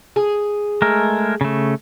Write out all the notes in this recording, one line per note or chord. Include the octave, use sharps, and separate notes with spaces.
G#4
G#3 A3 A#4
C#3 A3